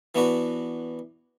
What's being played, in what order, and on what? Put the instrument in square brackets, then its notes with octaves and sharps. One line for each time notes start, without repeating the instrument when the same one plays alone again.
[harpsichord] E3 B3 D4 F#4 B4